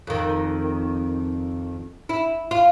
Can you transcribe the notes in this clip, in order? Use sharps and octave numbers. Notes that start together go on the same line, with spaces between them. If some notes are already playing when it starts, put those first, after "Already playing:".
F2 D#3
E4
F4